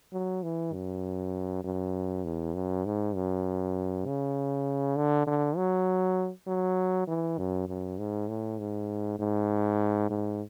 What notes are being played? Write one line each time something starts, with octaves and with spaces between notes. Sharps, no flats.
F#3
E3
F#2
F#2
E2
F#2
G#2
F#2
C#3
D3
D3
F#3
F#3
E3
F#2
F#2
G#2
A2
G#2
G#2
G#2